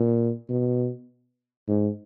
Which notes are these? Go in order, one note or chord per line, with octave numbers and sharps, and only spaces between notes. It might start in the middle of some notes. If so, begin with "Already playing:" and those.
Already playing: A#2
B2
G#2